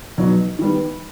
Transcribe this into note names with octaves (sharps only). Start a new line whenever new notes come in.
B2 F#3 B3 D#4
D#3 G3 B3